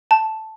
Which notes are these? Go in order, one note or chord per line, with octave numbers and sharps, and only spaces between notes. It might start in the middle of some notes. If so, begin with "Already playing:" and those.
A5